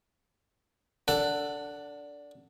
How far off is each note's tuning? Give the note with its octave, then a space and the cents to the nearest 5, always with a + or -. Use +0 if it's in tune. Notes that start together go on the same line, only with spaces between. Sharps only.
D4 -15 A4 +20 F#5 +0